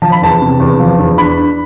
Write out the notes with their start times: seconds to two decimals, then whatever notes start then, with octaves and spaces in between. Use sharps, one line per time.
0.02 F3 A5
0.12 B5
0.22 E2 A5
0.41 C3
0.60 E2
0.80 F3
0.99 E2
1.18 D4 B5
1.38 D4